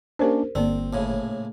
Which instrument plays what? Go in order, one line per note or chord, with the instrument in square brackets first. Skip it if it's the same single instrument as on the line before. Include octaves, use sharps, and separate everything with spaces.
[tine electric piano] A#3 C#4 D4 [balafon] G4 A#4 C5
[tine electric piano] G1 [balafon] A#3 D5 [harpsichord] C4
[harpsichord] A#1 A2 C#3